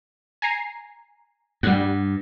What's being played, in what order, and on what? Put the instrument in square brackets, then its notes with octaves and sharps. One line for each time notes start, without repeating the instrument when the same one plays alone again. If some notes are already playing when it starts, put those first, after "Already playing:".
[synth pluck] G#5 A#5 C7
[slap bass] G2 [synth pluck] G3 F#5